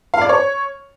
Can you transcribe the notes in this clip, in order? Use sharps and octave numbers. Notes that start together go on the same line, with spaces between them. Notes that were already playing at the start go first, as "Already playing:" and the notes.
F5
D5
C#5